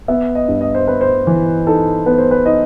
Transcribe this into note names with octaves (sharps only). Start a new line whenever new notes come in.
B3 E5
D#5
G2
D#5
C5
B3 B4
C5
E3
D#4 A4
B3 B4
C5
B4
D#4 D#5